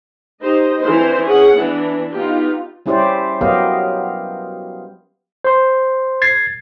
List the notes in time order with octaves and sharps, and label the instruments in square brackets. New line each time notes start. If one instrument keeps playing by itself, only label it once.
[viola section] D#4 G4 C5 D#5
E3 C4 D4 C5
C#4 G#4 F#5
E3 B3 D4
B3 D#4 F4 G4
[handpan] G3 C#4 E4 G4 C5 D5
F#3 B3 G4 A#4 D#5 F5
[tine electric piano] C5 C6
G#6 A6 C7